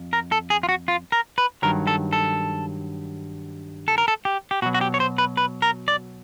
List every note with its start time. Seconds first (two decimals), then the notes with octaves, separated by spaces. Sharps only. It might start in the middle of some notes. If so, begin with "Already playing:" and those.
Already playing: F2
0.13 A#4
0.32 A4
0.50 G#4
0.63 F4
0.69 F#4
0.88 F4
1.12 A#4
1.38 B4
1.62 G2 D#3 F#3 A#4
1.87 A4
2.13 A4
3.88 A4
3.98 A#4
4.08 A4
4.25 G4
4.51 G4
4.62 B2 F#4
4.66 F#3
4.74 F#4
4.81 G4
4.94 C#5
5.00 C5
5.18 B4
5.37 B4
5.62 A#4
5.88 D5